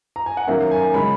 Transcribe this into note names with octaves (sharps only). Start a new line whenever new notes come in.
A#5
G#5
F#5
D#3 F#3 A#3 C#4 E5
G#5
C#3 G#3 C#4 B5